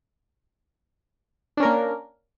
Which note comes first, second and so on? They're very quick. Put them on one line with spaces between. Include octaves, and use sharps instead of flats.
D4 C#4 A#4 A#3